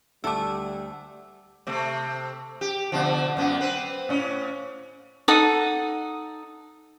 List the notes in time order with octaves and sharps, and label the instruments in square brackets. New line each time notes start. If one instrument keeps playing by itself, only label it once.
[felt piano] D2 D6 [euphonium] G3 [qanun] A3 A4 [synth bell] A5 E6
[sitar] C3 A3
G4
B2 D3 F3
F#2 B3
C4 B4
A2 C#4
[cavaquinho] D#4 A4 F#5 D#6